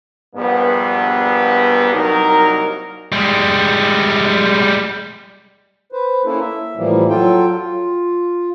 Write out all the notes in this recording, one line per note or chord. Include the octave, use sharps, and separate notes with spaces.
A#1 G2 B3
C2 F#3 A#3 D#4 A#4
G3 G#3
B4 C5
A#3 C#4 E4 A4
E5
A2 E3 F3 G3 A#3
F#3 F4 A4 G5
F4